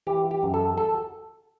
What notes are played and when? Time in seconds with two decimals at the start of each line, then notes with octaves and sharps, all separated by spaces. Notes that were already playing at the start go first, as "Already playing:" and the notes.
0.07 E3 G4
0.31 G4
0.43 F#2
0.54 A4
0.78 A4